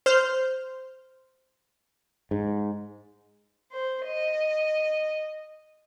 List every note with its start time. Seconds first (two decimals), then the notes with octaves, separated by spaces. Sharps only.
0.06 C5 F6 G6
2.31 G#2
3.71 C5
4.05 D#5